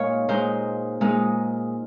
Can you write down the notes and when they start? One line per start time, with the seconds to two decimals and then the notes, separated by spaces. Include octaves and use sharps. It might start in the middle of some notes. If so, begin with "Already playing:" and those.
Already playing: A#2 G#3 D#4 C#5 F5
0.28 A#2 G#3 D#4 C5
1.01 A#2 G#3 D#4